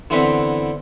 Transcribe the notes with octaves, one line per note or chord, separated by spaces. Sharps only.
D3 E3 B3 C4 B4